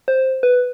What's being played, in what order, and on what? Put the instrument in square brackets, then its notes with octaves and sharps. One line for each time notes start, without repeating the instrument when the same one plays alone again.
[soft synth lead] C5
B4